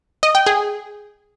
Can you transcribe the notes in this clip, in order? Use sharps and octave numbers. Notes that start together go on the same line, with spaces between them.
D#5
G5
G#4